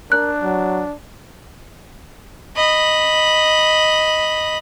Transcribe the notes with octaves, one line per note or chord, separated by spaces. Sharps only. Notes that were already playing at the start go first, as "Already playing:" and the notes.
D4 A#4 F#6
F#3
D#5 B5